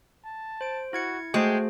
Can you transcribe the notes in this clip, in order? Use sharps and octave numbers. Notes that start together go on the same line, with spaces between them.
A5
C5 D7
E4 F#4 G#6 C#7
G#3 A3 F#4 G#4 C5 G5